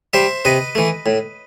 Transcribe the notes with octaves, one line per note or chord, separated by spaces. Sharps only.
G3 C5 E5
C3 B4 D#5
E3 A3
A2